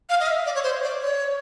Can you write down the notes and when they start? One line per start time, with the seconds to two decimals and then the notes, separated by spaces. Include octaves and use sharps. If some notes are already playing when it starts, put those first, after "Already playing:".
0.10 F5
0.20 D#5
0.27 E5
0.46 D5
0.55 C#5
0.64 C5
0.83 D5
1.01 C#5